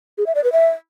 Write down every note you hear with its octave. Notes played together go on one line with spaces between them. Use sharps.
G#4
E5
D5
B4
E5